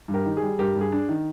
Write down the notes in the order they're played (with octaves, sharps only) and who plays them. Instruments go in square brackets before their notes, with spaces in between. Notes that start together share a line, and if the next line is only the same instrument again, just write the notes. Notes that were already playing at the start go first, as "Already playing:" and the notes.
[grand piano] G2
G4 A#4
D#3
G3 G#4
G2 G4 A#4
G2 G#4
D4
D#3